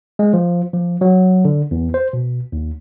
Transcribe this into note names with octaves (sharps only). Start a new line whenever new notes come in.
G#3
F3
F3
F#3
D3
E2
C5
B2
D#2